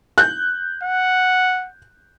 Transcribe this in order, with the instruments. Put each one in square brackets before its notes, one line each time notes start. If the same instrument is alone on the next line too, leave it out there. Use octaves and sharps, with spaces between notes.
[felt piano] F#6 G6
[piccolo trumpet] F#5